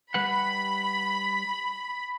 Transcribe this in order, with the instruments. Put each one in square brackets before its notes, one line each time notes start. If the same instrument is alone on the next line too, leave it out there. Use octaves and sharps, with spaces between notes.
[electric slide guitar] G3 B4 F#5 [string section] B5